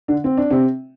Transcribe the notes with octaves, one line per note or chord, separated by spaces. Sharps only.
D3 D4
C4
D4
C3 C4